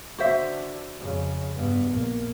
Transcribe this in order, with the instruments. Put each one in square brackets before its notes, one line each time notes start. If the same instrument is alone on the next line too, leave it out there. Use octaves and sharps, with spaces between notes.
[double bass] D3 [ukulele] F#4 C5 E5
[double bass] F2 C#3
G2 B3
A#1 A#3